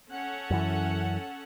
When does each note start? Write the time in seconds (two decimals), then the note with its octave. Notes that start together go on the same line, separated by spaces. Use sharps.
0.11 C#4 A4 F#5
0.51 F#2 E3